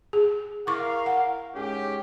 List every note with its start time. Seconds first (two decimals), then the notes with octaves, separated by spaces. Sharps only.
0.13 G#4
0.67 E4 A#4 F5 C#6 D6
1.06 F#5
1.55 G#2 C#4 G4